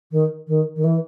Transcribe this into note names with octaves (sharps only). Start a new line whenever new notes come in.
D#3
D#3
D#3
E3